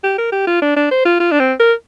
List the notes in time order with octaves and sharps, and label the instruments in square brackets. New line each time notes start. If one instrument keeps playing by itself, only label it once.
[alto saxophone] G4
A#4
G4
F4
D4
D4
C5
F4
F4
D4
C4
A#4